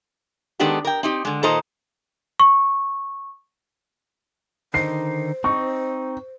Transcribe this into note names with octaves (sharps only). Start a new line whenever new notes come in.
D#3 G#3 B3 D4 G4 A4
A#4 G5
C4 D#4 G4
D3 G#3
A#2 D#3 A4 C5 D#5 A#5
C#6
D3 D#3 D#4 C5 C7
C4 D#4 C#6